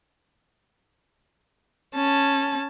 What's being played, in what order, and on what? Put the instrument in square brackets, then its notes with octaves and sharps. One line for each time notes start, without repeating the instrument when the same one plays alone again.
[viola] C#4 A5